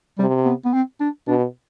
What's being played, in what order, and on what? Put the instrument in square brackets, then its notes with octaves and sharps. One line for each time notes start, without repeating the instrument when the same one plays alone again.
[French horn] C3 [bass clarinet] G3
[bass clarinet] B3
B3
C4
D4
[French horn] B2 [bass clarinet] D4